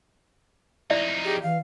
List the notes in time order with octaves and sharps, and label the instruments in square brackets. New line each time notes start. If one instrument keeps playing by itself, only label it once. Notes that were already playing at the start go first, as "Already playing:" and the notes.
[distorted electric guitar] F2 D#4 [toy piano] E4 D5 E5
[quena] G4 [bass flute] G#4
[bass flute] E3 [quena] F5